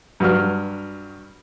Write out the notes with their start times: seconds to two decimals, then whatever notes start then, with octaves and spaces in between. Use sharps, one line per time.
0.20 G2 F#3 F6